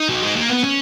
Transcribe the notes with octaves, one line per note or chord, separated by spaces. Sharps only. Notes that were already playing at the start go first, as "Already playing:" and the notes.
Already playing: D#4
F#3
G#3
A#3
B3
C#4